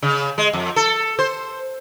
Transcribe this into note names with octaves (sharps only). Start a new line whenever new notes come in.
C#3
G#3
F2
A4
C5